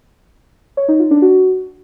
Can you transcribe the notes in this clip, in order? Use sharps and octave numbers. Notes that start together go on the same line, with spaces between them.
C#5
D#4
F4
D4
F#4